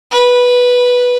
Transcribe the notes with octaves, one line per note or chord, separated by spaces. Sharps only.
B4